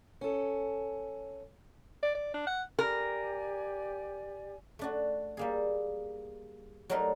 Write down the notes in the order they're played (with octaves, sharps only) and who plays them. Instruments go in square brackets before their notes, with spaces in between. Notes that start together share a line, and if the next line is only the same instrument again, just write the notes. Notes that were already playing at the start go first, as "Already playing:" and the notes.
[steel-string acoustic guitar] C#4 A4
[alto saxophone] D5
D5
D4
F#5
[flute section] G4 D5 G#5 [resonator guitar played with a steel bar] A#4
[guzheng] A3 D4 F#4
G3 A#3 G#4
F#3 G3 A3 D#4 A#4